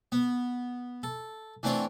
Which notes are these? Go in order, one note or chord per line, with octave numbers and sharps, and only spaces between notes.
B3
A4
E3 A3 C4 D4 F4 C#5